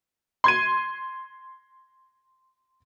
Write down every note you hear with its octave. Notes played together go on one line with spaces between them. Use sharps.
C6 G#6 D#7